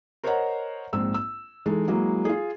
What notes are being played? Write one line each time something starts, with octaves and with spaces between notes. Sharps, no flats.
A#4 C5 C#5 D#5 F#5 A#5
A#1 G#2 C4 E6
E6
E3 G#3 D#4 A4
F#3 G#3 A#3 E4
F4 G#4